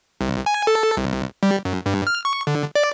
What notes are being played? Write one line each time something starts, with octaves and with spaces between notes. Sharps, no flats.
C2
G#5
A4
C2
G3
F#2
G2
F6
C#6
D3
D5